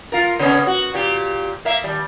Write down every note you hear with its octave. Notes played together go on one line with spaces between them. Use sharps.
F4 A#4
C#3 B3 C#4
F#4
A#2 G4
A#3 E5
D#2 G3